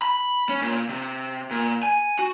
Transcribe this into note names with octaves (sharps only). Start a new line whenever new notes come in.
B5
C#4
A#2
C3
A#2
G#5
F#4